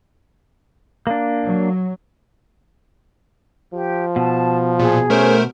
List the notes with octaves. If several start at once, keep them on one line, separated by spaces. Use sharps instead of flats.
A#3 D4
F#3
F3 G4
B2 A5
A#2 G#4
A3 C#4 A#4 C5